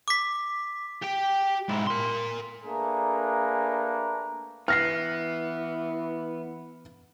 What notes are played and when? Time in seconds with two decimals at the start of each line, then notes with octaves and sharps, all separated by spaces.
0.08 D6 B6
1.03 G4 G5
1.69 G#2 E4
1.87 A#4 C6
2.64 A3 A#3 D4 G#4 B4 A#5
4.68 E3 B3 F6 A#6 C7